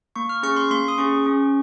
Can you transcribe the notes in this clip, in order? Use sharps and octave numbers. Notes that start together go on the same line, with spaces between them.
A#3 C#6
F6
C#4 G#4 C#6
C6
A#3 C6
D#6
C#4 G#4 C#6
C#4